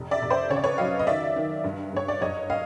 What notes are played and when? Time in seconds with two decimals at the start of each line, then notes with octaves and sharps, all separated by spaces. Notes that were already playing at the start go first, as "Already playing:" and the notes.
Already playing: F1
0.11 D5 E5
0.22 F1
0.30 C5 D5
0.50 C#3 C#5
0.56 D5
0.64 B4 C#5
0.78 F#3 D#5 F5
0.99 D#5
1.07 D#3 D5 E5
1.36 D#3
1.64 G2
1.93 G2 C#5
2.08 D5
2.21 F#1 C#5 D#5
2.50 D#5 F5